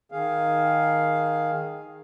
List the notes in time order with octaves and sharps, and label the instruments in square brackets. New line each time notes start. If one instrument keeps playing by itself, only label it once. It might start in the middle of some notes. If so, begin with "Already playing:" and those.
[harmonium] D#3 G#4 F5